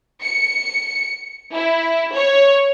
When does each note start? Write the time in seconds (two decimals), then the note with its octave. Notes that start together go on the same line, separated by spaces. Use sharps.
0.23 C#7
1.54 E4
2.14 C#5